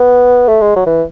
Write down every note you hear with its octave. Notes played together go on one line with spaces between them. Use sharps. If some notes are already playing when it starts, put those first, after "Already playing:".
Already playing: B3
A3
G#3
F#3
E3